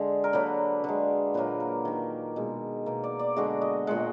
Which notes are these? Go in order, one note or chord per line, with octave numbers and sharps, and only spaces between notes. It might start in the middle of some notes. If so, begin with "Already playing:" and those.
Already playing: D3 G#3
A#4
D3 F#3 A#3 B4
D3 G#3
A#2 F#3 A#3 B4
A#4
D#3 A#3
B2 G#3
B2 A#3
D5
D5
D3 G#3 F#4
D#5
A#2 G#3 F#5